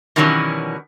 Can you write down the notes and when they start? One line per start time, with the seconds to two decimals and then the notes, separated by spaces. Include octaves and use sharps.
0.16 B2 D#3 E3 F#3 G3 C#4